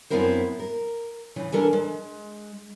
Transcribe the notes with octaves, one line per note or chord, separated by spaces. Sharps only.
F#2 B3 C4 E4 A#4 C5
A#4
C#3 E3 F3
E3 C#4 D4 A4 A#4
G#3